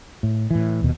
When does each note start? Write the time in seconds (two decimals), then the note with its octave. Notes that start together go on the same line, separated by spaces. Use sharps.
0.23 A2
0.51 A2 E3
0.82 D#1 D#2 B2